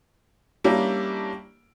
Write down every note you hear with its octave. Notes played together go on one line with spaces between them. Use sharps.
G3 A#3 C#4 D4 E4